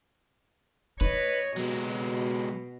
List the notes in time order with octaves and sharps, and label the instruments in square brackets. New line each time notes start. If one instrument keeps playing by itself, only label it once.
[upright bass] D#4 [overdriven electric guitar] B4 [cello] C#5 D#5
[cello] B2 [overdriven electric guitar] F#3 G#3